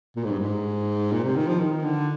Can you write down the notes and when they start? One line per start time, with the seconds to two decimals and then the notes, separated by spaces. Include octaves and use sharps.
0.16 A#2
0.24 G#2
0.31 G2
0.40 G#2
1.12 A#2
1.24 C3
1.36 D#3
1.48 F3
1.60 D#3
1.84 D3